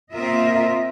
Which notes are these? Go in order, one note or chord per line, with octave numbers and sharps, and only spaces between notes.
A#3 C4 F4 A#4 D#5 E5